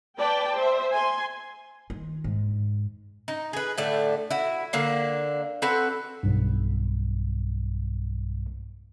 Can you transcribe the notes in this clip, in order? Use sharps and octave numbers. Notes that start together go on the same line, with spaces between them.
B4 D5 G5 A5
C5 E5
G#5 C6
D#3
G#2
D#4
G#4 B4
A2 D3 A3 D5
E4 F#4
D3 A#3 D4 F5
C4 F#4 A4 B4
B1 G2